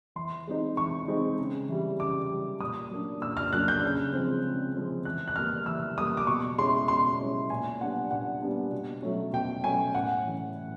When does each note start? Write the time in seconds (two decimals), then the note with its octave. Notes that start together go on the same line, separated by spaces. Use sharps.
0.16 E3 C6
0.47 G#3 C4 D#4
0.77 E3 C#6
1.08 G#3 C4 D#4
1.38 C#3
1.69 E3 G3
1.99 C#3 D6
2.30 E3 G3
2.61 A#2 D#6
2.91 F#3 A#3 D4
3.21 A#2 E6
3.37 F6
3.53 F#3 A#3 D4 F#6
3.68 G6
3.83 C#3
4.13 F3 G#3 C4
4.44 C#3
4.74 F3 G#3 C4
5.05 E3 F#6
5.28 F#6
5.36 G3 A#3 F6
5.66 E3 E6
5.97 G3 A#3 D#6
6.17 D6
6.27 B2 C#6
6.58 G#3 C#4 E4 C6
6.88 B2 C6
7.20 G#3 C#4 E4
7.49 A#2 G#5
7.80 G3 B3 D4 F#5
8.11 A#2 F#5
8.41 G3 B3 D4
8.72 B2
9.02 F#3 A3 C#4
9.33 B2 G5
9.64 F#3 A3 C#4 G#5
9.95 A2 F#5
10.25 E3 A3 C#4 E4
10.56 A2